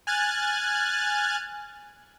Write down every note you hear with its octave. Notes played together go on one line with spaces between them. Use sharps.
G#5 F6 F#6 G#6 A6